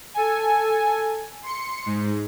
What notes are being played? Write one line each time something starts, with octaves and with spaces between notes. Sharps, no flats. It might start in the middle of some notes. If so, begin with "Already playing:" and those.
A4 G#5
C6 C#7
G#2